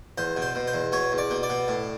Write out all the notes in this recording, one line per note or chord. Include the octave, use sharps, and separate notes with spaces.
E2 C5
B2
C5
B2
C5
E2
B2 C#5
E2
D5
B2
D5
B2
A2